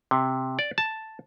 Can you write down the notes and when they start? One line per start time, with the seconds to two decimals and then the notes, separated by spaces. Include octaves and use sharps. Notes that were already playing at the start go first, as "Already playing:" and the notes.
0.11 C3
0.59 D5
0.78 A5